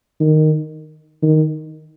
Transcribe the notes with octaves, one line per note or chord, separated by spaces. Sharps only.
D#3
D#3